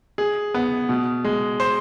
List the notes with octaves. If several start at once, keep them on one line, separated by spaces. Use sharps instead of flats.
G#4
B3
B2
G#3
C5